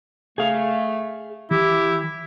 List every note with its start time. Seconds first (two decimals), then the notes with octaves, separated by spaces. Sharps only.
0.38 A3 G#4 F5
1.51 E3 E4 G4